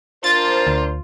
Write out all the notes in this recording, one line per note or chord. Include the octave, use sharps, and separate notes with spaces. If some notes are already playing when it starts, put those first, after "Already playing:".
D4 F4 A#4 C5 A6
D2